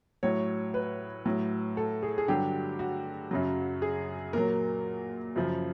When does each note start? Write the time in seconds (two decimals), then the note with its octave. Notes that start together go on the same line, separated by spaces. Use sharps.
0.23 A2 F#3 C#5
0.74 B4
1.25 A2 F#3
1.77 A4
2.03 G#4
2.18 G#4
2.28 G2 D3 F#3 G4
2.79 F#4
3.31 F#2 C#3 F#3
3.82 G#4
4.33 A#2 F#3 A#4
5.36 F#2 C#3 F3